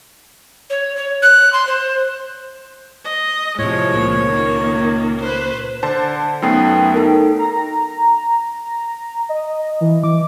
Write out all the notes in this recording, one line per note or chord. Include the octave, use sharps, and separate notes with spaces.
C#5
C#5
F#6
C6
C5
D#5
A2 C3 F3 G#3 C#5
C#2 A#2
D#3 A#3
B4 C5
D3 C5 A5
F#2 A3 B3 D#4 G5 C7
D#4 A4 A#4
A#5
A#5
D#5
E3
D6